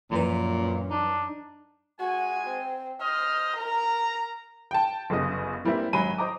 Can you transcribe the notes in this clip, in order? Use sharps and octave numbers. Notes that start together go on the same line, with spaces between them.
F#2 A#2 E3 F3 B4
D4 D#4
G#3 F#4 G#5
C4
C5 D#5 F6
A#4 A#5
G5 A5
G1 F#2 C#3 D#5
E3 G3 A#3 C4 E4
G#1 F#3 G#5 B5 D#7
C5 D#5 A#5 D6